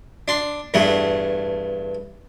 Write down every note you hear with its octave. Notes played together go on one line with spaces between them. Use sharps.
D4 C6
E2 G2 A3 F#5